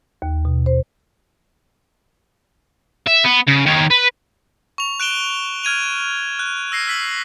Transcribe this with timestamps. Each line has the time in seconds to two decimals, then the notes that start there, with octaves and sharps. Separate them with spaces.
0.22 D#2
0.45 B2
0.66 C5
3.07 E5
3.24 B3
3.47 C#3
3.66 D#3 C#5
3.90 B4
4.78 C#6 F7
5.00 F#6 D7 E7 G7
5.63 F6 G#6 D#7 F7
6.39 F#6
6.72 E6 A#6 C7
6.87 E6 B6 F#7